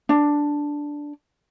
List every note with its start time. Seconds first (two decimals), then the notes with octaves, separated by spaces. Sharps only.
0.09 D4